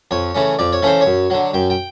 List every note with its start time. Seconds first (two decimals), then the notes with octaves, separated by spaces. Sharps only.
0.11 F2 C#5
0.35 C#3 E3 A3 C#4
0.59 F2 D5
0.73 C#5
0.82 C#3 E3 A3 C#4 C5
1.01 C#5
1.06 F#2
1.30 D3 F#3
1.53 F#2 G5
1.70 G5